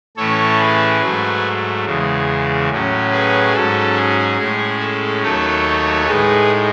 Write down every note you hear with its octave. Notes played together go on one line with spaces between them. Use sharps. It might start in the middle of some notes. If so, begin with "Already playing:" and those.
A2 E3 A3 C#4 A4 C#5
G#4 B4
G#2 F#3 A3
E2 C#3 G#3
A2 F#3 C#4
G#4 B4
G#2 F#3 C#4 A4
G#4
A2 G#3 C#4
A4
D#2 D#3 F#3 A3 D#4 A4 C#5
A2 G#3 D#4 G#4 B4